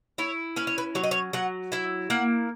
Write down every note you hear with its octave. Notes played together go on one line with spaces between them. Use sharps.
E4 C#5
C#4 B4
C#5
B4
F#3 C#5
D#5
C#5
F#3 F#5
E4 E5
A#3 F#5